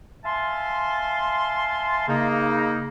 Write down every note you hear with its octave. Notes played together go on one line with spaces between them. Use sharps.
E5 F5 G#5 A5 C6
C#3 A#3 D#4